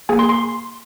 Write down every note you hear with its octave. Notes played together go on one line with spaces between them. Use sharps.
A#3 G#4 G#5
C6
C6